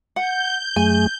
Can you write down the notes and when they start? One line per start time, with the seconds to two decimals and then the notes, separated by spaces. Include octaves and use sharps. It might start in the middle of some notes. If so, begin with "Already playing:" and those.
0.16 F#5 G6
0.76 F#2 A3 G#4 G#5